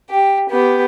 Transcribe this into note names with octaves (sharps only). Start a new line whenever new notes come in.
G4
B3 G4